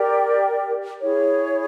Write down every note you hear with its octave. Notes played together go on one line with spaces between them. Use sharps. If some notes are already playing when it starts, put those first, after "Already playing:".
Already playing: G4 A#4 D5 G5
E4 G#4 C#5